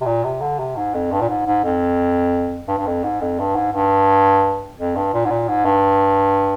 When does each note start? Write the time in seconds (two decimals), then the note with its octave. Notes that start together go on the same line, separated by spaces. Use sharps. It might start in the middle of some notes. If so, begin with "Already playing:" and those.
0.01 C3
0.06 A#2
0.24 C3
0.41 D3
0.59 C3
0.76 G#2
0.94 F2
1.12 G2
1.21 A#2
1.29 G#2
1.47 G#2
1.64 F2
2.68 G2
2.78 G2
2.87 F2
3.04 G#2
3.21 F2
3.39 G2
3.55 G#2
3.73 G2
4.78 F2
4.96 G2
5.14 A#2
5.25 G#2
5.31 A#2
5.48 G#2
5.65 G2